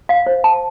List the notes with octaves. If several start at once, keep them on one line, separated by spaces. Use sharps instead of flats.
F5
C5
A5